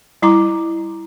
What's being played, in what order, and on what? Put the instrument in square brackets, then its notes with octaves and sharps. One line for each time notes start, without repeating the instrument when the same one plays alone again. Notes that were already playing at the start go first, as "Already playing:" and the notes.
[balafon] G3 E4 A#5 D6